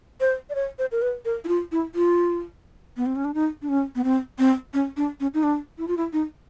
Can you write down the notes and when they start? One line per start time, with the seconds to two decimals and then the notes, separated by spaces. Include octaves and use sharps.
0.21 C5
0.50 D5
0.55 C#5
0.79 C5
0.92 A#4
1.02 B4
1.25 A#4
1.44 E4
1.48 F4
1.72 E4
1.95 F4
2.97 B3
3.06 C4
3.16 C#4
3.25 D4
3.34 D#4
3.62 D4
3.69 C#4
3.96 B3
4.04 C4
4.39 C4
4.74 C#4
4.97 D4
5.20 C#4
5.34 D#4
5.43 D4
5.78 E4
5.88 F4
5.97 E4
6.13 D#4